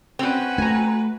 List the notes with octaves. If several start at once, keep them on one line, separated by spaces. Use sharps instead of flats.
C4 C#4 F#4 B4
A3 G#5 A#5